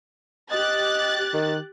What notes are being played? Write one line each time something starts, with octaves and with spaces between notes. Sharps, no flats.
G4 D#5 F#6 A6
D#3